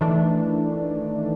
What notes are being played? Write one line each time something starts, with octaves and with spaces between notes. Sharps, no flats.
D#3 E3 A3 D4